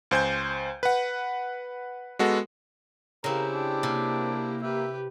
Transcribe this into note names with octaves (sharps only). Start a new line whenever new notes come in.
C#2 C5 G#5 G6
B4 F#5
G#3 B3 F#4 A4
C#3 C4 E4 G4 A#4
D4
C3 A#3
G4 B4 E5